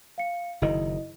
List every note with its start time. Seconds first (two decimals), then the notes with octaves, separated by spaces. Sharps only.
0.18 F5 C#7
0.62 F#1 D#3 E4 D#5